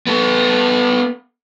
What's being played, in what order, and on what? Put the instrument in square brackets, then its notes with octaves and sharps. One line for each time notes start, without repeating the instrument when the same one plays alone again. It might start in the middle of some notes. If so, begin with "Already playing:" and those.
[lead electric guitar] B3 A4